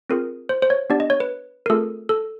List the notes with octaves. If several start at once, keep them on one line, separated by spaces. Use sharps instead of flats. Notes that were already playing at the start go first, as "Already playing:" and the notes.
C4 F4 G#4 A#4
C5
C5
C#5
B3 D4 G4 D5
D#5
C#5
B4
A#4
A3 C4 F4 G#4 A4
A4